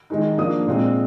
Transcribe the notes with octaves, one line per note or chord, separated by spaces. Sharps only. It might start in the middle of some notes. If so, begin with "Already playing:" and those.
D#3 G#3 D#4
F3 A#3 D4 D#6
A#2 G#3 C4